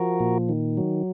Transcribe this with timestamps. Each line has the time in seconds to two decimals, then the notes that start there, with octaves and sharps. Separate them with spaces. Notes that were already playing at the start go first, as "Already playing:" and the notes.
Already playing: F3 F#4 A#4
0.20 A#2
0.49 D#3
0.77 F#3